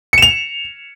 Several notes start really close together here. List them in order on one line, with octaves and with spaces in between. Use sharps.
C#7 E7 F7